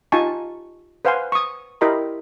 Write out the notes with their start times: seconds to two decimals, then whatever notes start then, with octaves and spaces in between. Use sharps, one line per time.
0.12 D#4 F4 G4 G#5 A5 C#6
1.05 B4 C5 F5 F#5 G#5 C6
1.32 C#6 D#6
1.81 E4 G4 A#4 D#5 B5 C6